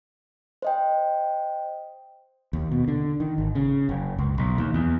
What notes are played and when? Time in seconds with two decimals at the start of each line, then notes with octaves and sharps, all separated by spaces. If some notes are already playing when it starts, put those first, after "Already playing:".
0.62 C5 D#5 G5
2.53 D#2
2.72 B2
2.88 D3
3.20 D#3
3.38 G#1
3.55 C#3
3.89 F#1
4.18 C#2
4.38 B1
4.58 D#2
4.74 E2